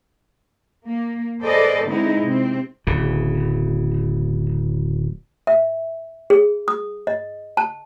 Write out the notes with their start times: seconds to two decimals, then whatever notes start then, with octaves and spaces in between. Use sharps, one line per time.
0.88 A#3
1.44 G#4 A4 B4 C5 D5 D#5
1.88 D3 G#3 B3 C4 D#4 E4
2.23 C3 C4
2.87 D1 C#3
5.47 E5
6.30 G#4
6.68 D#6
7.07 D#5
7.57 A5